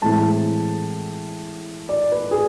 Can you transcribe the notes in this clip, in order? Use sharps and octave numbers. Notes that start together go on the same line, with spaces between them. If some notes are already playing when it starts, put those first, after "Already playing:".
A2 E3 G#3 C4 A5
D5
B4
G#4